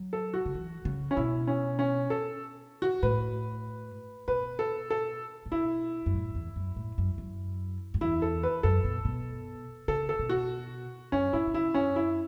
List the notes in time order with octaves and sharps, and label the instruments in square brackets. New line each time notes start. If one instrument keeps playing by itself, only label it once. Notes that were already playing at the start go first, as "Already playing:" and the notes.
Already playing: [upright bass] F#3
[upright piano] A4
F#4
[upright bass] C#3
E3
C#3
[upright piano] C#4
[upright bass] B2 [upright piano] E4
[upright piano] C#4
C#4
A4
F#4
[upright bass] A2 [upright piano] B4
[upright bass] B2 [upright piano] B4
[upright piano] A4
A4
[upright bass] A2
[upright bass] B2 [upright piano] E4
[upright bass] F#2
A2
E2
F#2
A2
F#2
F#2
F#2
[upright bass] E2 [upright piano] E4
[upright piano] A4
B4
[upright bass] F#2 [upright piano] A4
[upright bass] B2
B2
[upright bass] C#3 [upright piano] A4
[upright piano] A4
[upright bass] B2
[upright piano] F#4
[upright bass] F#2 [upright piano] C#4
[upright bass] A2 [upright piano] E4
[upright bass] B2
[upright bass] C#3 [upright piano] E4
[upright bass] F#2 [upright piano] C#4
[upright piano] E4